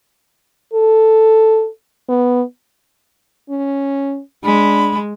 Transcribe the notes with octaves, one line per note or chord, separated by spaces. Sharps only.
A4
B3
C#4
G#3 D4 B5